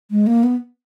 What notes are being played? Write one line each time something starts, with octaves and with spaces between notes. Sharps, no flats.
G#3
A#3
B3